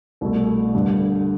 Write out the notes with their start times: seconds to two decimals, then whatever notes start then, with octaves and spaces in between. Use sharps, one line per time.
0.21 C2 B2 A3
0.75 G1 G2 D3